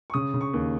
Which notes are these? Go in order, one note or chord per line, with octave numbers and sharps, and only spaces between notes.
C#6
C#3 D#6
C#3
C#6
D#2